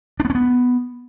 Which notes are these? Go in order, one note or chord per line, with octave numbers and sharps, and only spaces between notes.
D4
B3
C#4
B3